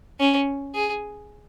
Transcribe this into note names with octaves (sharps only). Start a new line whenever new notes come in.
C#4
G#4